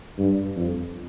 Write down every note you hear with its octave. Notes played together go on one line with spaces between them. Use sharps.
G2
F2